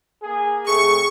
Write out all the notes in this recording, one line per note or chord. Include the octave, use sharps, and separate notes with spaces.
A#3 G#4
C3 A3 G#4 C#6